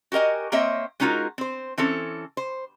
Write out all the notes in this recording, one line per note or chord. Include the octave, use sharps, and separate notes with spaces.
F#4 G4 A#4 D#5 G#5
A#3 C4 C5 C#5 D#5 E5
G#3 C#4 D#4 F4 F#4 A#4
C4 C5
E3 C4 C#4 A4
C5